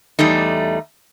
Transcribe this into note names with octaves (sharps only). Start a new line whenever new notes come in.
E2 G3 A3 D#4